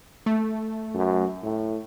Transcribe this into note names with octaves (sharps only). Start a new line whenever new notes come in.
A3
F#2
A2